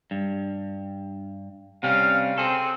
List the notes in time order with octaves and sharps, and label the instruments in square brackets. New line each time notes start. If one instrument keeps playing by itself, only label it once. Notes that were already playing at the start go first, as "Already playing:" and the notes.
[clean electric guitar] G2
[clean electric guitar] C3 G3 C#4 [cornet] F5
[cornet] C4 [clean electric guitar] G#4 A4